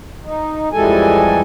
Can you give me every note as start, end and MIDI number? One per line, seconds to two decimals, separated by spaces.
0.23 0.69 63
0.73 1.41 41
0.73 1.41 52
0.73 1.41 55
0.73 1.41 56
0.73 1.41 69
0.73 1.41 80